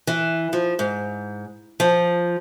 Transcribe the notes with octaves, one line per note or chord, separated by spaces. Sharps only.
E3
F3
G#2
F3